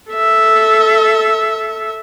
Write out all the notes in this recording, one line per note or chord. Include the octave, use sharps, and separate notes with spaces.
A4 E5